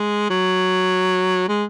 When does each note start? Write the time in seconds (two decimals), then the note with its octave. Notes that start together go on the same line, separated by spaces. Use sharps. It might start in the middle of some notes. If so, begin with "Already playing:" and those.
Already playing: G#3
0.30 F#3
1.49 G#3